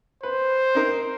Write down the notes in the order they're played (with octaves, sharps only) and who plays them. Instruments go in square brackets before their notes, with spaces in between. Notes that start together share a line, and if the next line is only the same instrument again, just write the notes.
[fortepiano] B4 [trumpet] C5
[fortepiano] C4 D#4 A#4